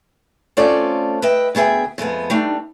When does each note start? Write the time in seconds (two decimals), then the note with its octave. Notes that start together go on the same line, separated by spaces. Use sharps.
0.57 A3 C4 C#4 F4 A4 D5
1.22 B4 D#5 E5 G5
1.55 D2 B3 G#4 E5 G5
1.98 F2 G#3 A3 B3
2.30 G3 A3 D4 D#4